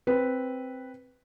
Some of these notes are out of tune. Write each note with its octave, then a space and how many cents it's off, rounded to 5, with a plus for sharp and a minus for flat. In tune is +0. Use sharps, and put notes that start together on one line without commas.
C4 +0 B4 +0